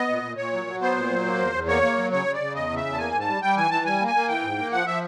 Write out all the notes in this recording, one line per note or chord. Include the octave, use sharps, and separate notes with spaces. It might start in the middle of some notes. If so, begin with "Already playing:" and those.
Already playing: B3 D#5
A#2
A#2
A#2 C#5
F#3
F#3
B3 C5
A#2
F#3
A#3
E2
E2
A#3 C#5
A#3
F#3
C#3 C#5
C#3
D5
C#3
E2 D#5
C#3
E5
E2
A5
A#3 G#5
G#2
A5
G3
G3 G5
E3 G#5
E3 A5
G3 G#5
A#3
G#5
A#3
E3 G5
G#2
A#3
F3 F#5
F3 E5